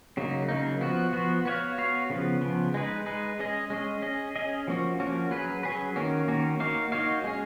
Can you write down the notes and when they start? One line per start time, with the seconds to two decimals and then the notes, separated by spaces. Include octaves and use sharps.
0.17 C#3 F#3 A#3 D#4
0.49 C#3 F#3 A#3 D#4
0.81 F3 B3 F#4
1.13 F3 B3 F#4
1.45 B3 F#4 C#5 F5
1.78 B3 F#4 C#5 F5
2.10 C#3 F3 B3
2.41 C#3 F3 B3
2.74 G#3 D#4 G#4 B4
3.06 G#3 D#4 G#4 B4
3.39 G#3 C#4 G#4 D#5
3.70 G#3 C#4 G#4 D#5
4.02 C#4 G#4 D#5
4.36 C#4 G#4 D#5
4.68 F3 A#3 C#4 F#4
5.00 F3 A#3 C#4 F#4
5.31 F#3 C#4 G#4 B4
5.63 F#3 C#4 G#4 B4
5.96 D#3 A#3 C#4 F#4
6.28 D#3 A#3 C#4 F#4
6.60 A#3 D#4 F#4 C#5 F5
6.92 A#3 D#4 F#4 C#5 F5
7.24 G#3 C#4 G#4